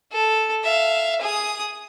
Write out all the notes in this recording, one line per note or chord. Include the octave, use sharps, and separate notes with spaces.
A4
E5 F5
G#4 D#6